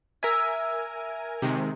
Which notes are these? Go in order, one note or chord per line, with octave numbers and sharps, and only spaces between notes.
A#4 E5 G#5
C3 D#3 G#3